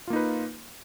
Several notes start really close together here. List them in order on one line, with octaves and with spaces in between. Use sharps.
F4 A#3 D#4 B4